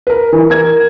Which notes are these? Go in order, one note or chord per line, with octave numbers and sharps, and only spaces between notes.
A#4 B4
E3
A#4 G#6